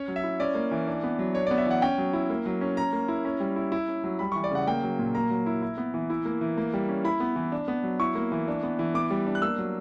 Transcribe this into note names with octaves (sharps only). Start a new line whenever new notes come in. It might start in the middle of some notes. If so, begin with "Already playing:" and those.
Already playing: C#4 C#5
F#3
E5
E4
C#4 D5
A#3
E3
D4
B3
F#3
D4 C#5
D5
B3
E5
E3 F#5
C#4 G5
F#3
E4
A#3
F#3
C#4
C#4 A#5
A#3
E4
C#4
G3
E4
E4
C#4
F#3
G3 B5
C#6
E3
D5
C#3 F#5
A#3 G5
F#3
A#2
A#3 A#5
F#3
E4
E4
B3
E3
E4
A#3
E3
A#3
G3
C#4
E4 B5
B3
E3
D4
B3
F#3
E4 C#6
A#3
E3
D4
B3
E3
B3 D6
G3
D4
F#6
A#3 E6
F#3